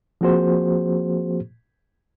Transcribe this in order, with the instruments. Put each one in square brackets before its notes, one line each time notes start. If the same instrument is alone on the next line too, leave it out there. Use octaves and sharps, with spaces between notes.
[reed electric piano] F3 A#3 C4 F#4 G#4 C5